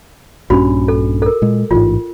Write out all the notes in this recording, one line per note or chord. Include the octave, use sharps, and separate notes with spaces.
A#1 G2 C#4 F#4 B5
A4
A4 A#4
A#2 G#3
A1 G#2 F4